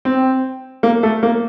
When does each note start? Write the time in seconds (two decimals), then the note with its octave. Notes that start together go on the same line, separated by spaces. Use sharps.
0.05 C4
0.83 A#3
1.03 A3
1.23 A#3